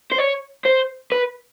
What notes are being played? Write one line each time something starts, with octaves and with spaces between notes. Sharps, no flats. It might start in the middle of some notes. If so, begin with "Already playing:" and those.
C5
C#5
C5
B4